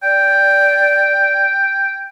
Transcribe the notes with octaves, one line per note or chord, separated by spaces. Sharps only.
D5 G5